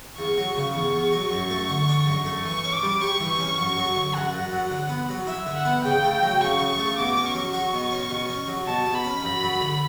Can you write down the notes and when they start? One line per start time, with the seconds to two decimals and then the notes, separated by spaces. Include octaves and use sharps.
0.17 E2 C#6
0.37 F#3
0.56 C#3
0.74 E2 C#6
0.93 E2
1.12 F#3
1.31 F#2
1.51 A3
1.69 D3
1.88 D4
2.06 F#2
2.25 A3
2.45 E3 C#6
2.64 C#4
2.73 D6
2.83 G3
3.01 G4 C#6
3.20 E3
3.29 C#6
3.39 C#4
3.58 F#2
3.77 F#3
3.96 D3
4.14 F#2 F#5
4.33 F#2
4.51 F#3
4.71 D3
4.89 B3
5.09 F#3
5.27 E4 E5
5.46 D3
5.55 F#5
5.65 B3
5.84 C#3 G5
6.03 A3
6.22 F#3
6.41 C#3 C#6
6.60 C#3
6.78 A3
6.97 B2 D6
7.16 C#4
7.25 C#6
7.35 F#3
7.53 F#4
7.73 B2
7.91 C#4
8.10 B2
8.29 C#4
8.47 F#3
8.66 B2 A5
8.86 B2
8.95 B5
9.04 C#4
9.24 F#2 B5
9.43 F#3
9.61 D3